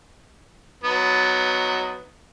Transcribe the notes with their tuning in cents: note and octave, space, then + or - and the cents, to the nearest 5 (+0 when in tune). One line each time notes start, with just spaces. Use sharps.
F#3 +0 B3 +15 D#4 +0